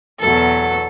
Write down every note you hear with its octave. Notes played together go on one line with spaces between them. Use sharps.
E2 B2 F#3 A4